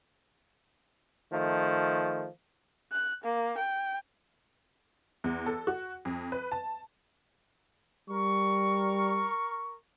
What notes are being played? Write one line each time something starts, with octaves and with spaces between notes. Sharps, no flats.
D#3 F3 A3
F#6
A#3
G5
E2
A4
F#4
F2
B4
A5
G3 A#4 C#6